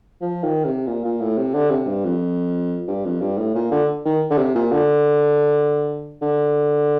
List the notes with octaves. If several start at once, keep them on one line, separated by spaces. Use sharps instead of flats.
F3
D#3
C3
A#2
A#2
A2
C3
D3
C3
G2
F2
G2
F2
G2
A2
A#2
D3
D#3
D3
C3
A#2
D3
D3